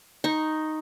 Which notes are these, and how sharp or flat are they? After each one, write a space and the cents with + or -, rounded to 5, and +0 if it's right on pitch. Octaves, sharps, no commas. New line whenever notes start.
D#4 +0 C#6 -20